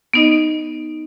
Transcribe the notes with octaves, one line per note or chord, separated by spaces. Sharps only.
B3 D#4 D#5